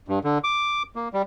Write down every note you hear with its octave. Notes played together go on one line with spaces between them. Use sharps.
G2
D3
D6
A#3
G3